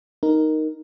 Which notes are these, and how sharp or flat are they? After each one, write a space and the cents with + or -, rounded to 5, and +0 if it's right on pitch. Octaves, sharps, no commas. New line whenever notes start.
D#4 +0 A#4 +0